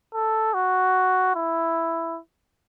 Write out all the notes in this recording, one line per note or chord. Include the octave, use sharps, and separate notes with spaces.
A4
F#4
E4